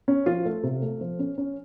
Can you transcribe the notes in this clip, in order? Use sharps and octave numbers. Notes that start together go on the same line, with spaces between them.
C#4
F3 F4
A3
C3
A3
F3
C#4
C#4